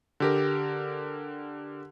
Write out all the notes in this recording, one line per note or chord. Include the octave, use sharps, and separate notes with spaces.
D3 G4 A#4